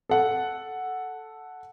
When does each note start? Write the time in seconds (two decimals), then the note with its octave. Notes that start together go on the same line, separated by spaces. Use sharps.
0.10 A4 F#5